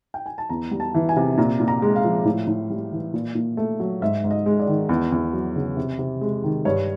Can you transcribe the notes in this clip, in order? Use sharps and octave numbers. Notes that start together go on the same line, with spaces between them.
G5
G#5
A5
E2 A#5
G3
A5
E3
G#5
C3
A#2 A#5
A#2
A#5
G#3
F5
F3
A2
A2
G3
E3
A#2
A#2
A3
F#3
G#2 E5
G#2
D#5
G#3
D5
D#3
E2
E2
F#3
C#3
C3
C3
G#3
D#3
G2 C#5